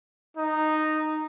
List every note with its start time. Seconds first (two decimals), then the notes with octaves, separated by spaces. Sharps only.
0.37 D#4